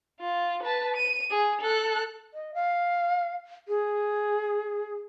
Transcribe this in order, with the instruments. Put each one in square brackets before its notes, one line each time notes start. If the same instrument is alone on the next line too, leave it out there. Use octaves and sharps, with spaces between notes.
[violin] F4
B4 A5
D#7
G#4
A4 F#6
[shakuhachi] D#5
F5
G#4